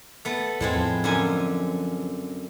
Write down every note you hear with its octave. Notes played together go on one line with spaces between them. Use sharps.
A3 B3
E2 A2 G#3 C4
F3
F#2 D3 G#5